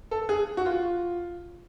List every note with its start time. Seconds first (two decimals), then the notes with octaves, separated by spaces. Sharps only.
0.11 A4
0.29 G#4
0.57 F#4
0.66 F4